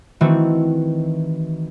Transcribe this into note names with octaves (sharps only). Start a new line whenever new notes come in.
D#3 E3 A3 C4 F#4